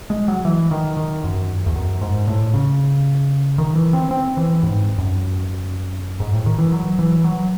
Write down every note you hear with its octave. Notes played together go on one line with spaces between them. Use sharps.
G#3
F#3
E3
D#3
D#3
F#2
E2
F#2
G#2
A2
C#3
D#3
E3
C4
C4
E3
G#2
F#2
G#2
A2
D#3
E3
F#3
E3
F#3